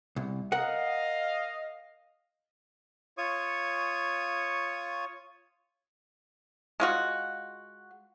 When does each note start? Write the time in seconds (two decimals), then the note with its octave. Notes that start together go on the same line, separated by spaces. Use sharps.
0.16 C2
0.52 A#4 D#5 F5 F#5
3.18 F4 C#5 C#6 D#6
6.80 G#3 F4 F#4